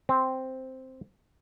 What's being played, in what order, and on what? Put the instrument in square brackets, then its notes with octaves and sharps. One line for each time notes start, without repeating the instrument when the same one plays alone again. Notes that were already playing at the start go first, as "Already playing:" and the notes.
[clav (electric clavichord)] C4